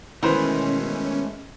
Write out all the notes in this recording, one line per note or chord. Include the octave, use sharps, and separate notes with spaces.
B2 D#3 E3 G#3 A3 C#4 B4 C5